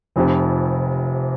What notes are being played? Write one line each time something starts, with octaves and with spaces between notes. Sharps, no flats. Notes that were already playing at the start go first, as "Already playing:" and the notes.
F1 F2 C3